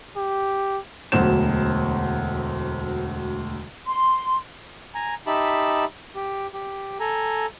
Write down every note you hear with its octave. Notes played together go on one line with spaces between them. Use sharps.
G4
E1 D2 F#3 C5 E7
C6
G#5 A#5
D#4 G4 E5 A5 B5
G4
G4
A4 G#5 A#5